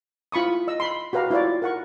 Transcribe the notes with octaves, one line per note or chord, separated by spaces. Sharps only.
E4 F4 B5 C#6 D#6
D#5 E6
B5 C6
F#4 G4 B4 F5 A#5
E4 F4 C#5 D5
A#4 F#5 C#6